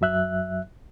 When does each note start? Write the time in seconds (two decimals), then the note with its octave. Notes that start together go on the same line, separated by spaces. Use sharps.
0.01 F#2 F#3 E5 F#6